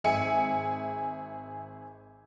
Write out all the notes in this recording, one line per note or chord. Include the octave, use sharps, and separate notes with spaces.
G#1 G#4 E5 G#5 C#7